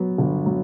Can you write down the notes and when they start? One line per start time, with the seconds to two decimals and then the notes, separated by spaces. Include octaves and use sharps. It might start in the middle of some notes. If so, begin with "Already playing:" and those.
Already playing: F#3 B3
0.18 G1
0.46 F#3